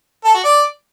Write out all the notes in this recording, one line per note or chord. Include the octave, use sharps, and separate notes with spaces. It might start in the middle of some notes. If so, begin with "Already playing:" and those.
A4
F#4
D5